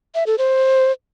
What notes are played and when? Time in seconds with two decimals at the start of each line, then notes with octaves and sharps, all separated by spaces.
0.15 E5
0.27 A4
0.38 C5